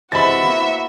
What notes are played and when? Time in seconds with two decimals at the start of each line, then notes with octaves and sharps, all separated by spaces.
0.12 C3 E3 G#3 F#4 E5 B5 A6
0.43 A#3 B3 E4